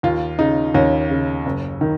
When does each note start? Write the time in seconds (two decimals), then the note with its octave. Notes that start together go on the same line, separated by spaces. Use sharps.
0.03 D#2 F4
0.39 C#3 D#4
0.74 D#2 C#4
1.10 C#3
1.46 F#1
1.81 D#3